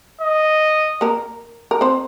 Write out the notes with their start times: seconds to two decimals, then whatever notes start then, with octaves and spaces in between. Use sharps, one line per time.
0.21 D#5
1.01 A#3 A#4
1.71 A#4
1.81 C4 C5